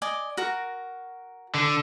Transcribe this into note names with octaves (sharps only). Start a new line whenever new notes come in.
D5 D#5 G#5
F#4 A#4
D3